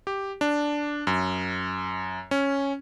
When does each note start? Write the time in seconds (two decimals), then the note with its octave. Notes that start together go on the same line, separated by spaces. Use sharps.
0.07 G4
0.41 D4
1.07 F#2
2.31 C#4